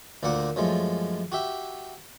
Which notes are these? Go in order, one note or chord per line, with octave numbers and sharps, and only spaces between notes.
D2 A#2 A#3 F#5 D6
F#2 F3 G#3 A3
F#4 G4 E5